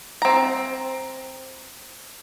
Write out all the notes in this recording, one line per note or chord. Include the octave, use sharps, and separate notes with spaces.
C4 A#5